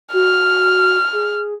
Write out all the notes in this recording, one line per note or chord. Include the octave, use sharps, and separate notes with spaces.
F#4 F6
G#4